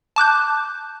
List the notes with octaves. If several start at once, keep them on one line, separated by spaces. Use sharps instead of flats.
A5 D6 F#6 G6